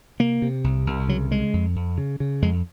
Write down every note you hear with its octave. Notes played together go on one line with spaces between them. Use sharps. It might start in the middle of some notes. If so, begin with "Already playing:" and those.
C3 A#3
C3
C2
C2
C#3 F#3
C#3 G#3
F2
F2
C#3
C#3
F2 G#3